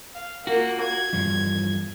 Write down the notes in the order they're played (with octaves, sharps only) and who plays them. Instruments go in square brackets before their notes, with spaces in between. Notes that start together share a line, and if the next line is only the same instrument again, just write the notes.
[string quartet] F5
[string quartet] A#3 [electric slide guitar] F4 F#4
[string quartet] G#6
[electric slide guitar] E2 G2 F3